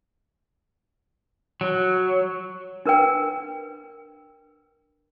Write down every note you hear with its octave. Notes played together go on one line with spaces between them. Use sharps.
F#3
D4 A#4 B4 G5